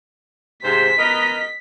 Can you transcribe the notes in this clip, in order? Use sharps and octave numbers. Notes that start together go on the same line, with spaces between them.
G#2 C3 C5 B6
B3 A#4 D#5